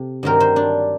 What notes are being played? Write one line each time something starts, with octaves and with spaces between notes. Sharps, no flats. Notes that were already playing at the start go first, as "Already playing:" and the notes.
Already playing: C3 C4 A4
G2 D#3 F#3 C4 A#4
C5
D4